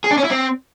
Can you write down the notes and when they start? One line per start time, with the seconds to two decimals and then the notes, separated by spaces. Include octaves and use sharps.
0.04 G#4
0.11 D4
0.17 C#4
0.24 E4
0.31 C4